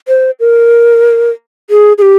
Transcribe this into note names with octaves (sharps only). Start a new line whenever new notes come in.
C5
A#4
G#4
G#4
G4